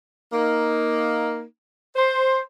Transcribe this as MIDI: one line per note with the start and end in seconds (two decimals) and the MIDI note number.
0.33 1.42 58
0.33 1.42 63
1.96 2.40 72